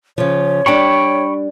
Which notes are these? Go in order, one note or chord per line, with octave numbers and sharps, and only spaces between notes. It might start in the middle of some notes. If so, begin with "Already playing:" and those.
C#3 F3 C#5
G3 D4 G5 B5 C#6